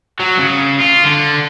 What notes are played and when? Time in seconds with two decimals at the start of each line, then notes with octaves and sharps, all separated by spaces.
0.20 F#3
0.38 C#3
0.81 F4
1.04 D3